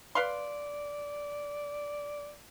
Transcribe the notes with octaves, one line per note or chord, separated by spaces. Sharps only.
B4 D5 F5 C6